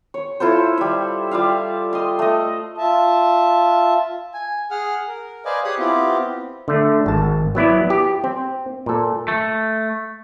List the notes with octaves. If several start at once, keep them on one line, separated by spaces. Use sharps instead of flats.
C#5
E4 F4 A4 C5
G3 E5
G3 F4 E5 F5
D#5 C6
A3 D#5
F4 E5 A5
G#5
G#4 F#5 F6
A#4
B4 C5 D5 D#5 F5 G#5
G4 G#4 C#5 D#6 F#6
B3 C4 E4 F4 G4
D3 A3
G#1 A5
F#3 B3 E4 D5
G4
C4
A#2 A4
A3